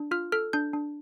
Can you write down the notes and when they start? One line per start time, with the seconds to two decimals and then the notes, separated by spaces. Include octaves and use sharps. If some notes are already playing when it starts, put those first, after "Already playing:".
Already playing: D4
0.11 F4 F6
0.32 A4 F6
0.53 D4 G6
0.73 D4